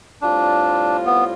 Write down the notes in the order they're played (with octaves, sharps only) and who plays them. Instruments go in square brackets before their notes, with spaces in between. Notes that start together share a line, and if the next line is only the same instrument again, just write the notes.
[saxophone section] A2 G3 C4 F4 [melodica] D4
[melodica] B3